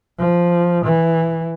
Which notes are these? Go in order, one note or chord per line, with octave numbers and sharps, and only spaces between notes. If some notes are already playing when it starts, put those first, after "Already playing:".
F3
E3